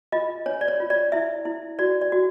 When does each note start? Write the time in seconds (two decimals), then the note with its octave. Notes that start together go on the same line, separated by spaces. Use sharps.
0.12 F4 D#5
0.46 D4 C#5
0.61 D5
0.68 C#5
0.80 F4
0.90 D5
1.12 E4 E5
1.45 E4
1.79 F#4 D5
2.01 D5
2.12 F#4